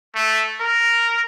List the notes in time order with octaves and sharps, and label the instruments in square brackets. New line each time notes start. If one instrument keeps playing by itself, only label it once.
[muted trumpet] A3
A#4